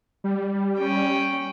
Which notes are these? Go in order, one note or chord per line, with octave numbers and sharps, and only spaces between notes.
G3
C#4 G5